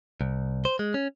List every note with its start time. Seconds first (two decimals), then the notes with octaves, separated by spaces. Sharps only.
0.21 C2
0.65 C5
0.79 G#3
0.94 C#4